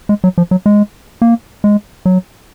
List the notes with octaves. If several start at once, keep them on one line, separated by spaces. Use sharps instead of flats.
G#3
F#3
F3
F#3
G#3
A#3
G#3
F#3